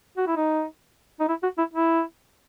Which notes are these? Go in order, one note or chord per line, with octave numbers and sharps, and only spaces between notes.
F#4
E4
D#4
D#4
E4
F#4
E4
E4